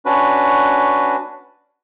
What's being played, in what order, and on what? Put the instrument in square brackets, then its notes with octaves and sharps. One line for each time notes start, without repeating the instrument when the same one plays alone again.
[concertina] C#4 D4 F#4 B4